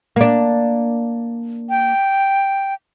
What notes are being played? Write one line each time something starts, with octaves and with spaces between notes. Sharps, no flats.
A#3 D4
G5